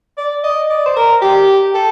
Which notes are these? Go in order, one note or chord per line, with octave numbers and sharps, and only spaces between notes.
D5
D#5
D5
C5
A#4
G4
A4